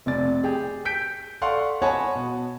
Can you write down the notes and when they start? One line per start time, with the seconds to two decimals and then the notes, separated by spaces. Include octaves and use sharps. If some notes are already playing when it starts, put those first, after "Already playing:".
0.06 F1 C3 D5 A6
0.44 G4 G#4
0.85 G6 B6 D7
1.41 A4 D5 F5 F#5 C6 C#6
1.82 C#5 D#5 F#5 G#5 A5 B5
2.15 B2